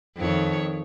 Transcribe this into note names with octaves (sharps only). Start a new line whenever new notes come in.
F2 D#3 C#5